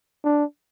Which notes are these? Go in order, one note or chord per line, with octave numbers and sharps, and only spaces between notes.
D4